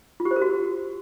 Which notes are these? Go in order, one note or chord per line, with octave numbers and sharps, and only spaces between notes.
F4
G4
C5
A#4
F#4